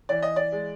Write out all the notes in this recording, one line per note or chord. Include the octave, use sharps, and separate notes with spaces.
E3 D5
D#5
D5
G#3